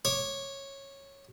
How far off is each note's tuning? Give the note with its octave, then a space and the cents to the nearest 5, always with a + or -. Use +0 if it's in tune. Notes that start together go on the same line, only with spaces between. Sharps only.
C#5 -10 D6 +0